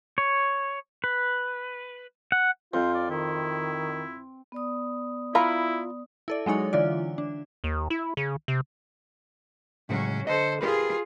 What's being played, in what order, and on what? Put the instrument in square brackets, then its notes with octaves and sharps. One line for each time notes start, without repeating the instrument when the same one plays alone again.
[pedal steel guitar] C#5
B4
F#5
[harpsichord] F2 [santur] C4 [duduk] F4 [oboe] C5
[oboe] D5
[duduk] D#3 [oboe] E4
[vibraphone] B3 D5 D#6
[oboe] E4 [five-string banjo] F4 A#4 F5 [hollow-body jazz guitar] B5
[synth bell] E4 A4 D5
F#3 G#3 D#4 C#5 F#5
D3 E3 F4 D5
D4
[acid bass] D#2
E4
C#3
C3
[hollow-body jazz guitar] A2 C#3 G#3 [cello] F#3 C#4
[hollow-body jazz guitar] D3 D#5 [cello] A4 C5
[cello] F4 G#4 [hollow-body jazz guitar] G4 A#4 B4